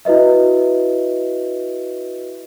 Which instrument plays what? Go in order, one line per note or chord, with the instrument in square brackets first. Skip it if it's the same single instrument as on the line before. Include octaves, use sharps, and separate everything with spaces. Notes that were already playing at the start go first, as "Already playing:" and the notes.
[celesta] E4 F#4 B4 D#5 E5